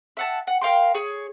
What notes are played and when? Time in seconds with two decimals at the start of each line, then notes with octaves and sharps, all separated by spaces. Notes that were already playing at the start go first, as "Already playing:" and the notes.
0.17 E5 F#5 A5
0.47 F#5
0.61 A#4 F5 G5 C6
0.95 G#4 C#5